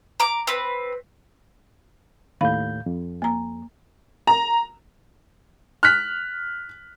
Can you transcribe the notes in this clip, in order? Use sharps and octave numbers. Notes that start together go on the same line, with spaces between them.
A#5 D6
C4 B4
D#2 A2 F5 B5 G6
F2
A#3 A#5
A#5
F6 F#6 B6